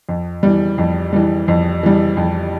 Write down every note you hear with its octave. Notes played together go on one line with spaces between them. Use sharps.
F2
E3 G3
F2
E3 G3
F2
E3 G3
F2